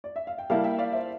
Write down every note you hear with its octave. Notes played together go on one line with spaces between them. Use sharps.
D5
E5
F5
G5
G3 A#3 E4 F5 A5
E5 G5
D5 F5
C5 E5